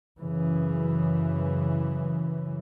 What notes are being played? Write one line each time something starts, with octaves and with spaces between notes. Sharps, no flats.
F#2 C#3 E3